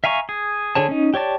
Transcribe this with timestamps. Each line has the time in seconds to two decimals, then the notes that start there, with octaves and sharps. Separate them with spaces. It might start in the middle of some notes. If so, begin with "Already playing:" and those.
0.04 E5 F5 G#5 A#5 C#6
0.29 G#4
0.75 D3 G#4 C#5 A5
0.89 C#4 D#4
1.14 G4 C#5 D5 A5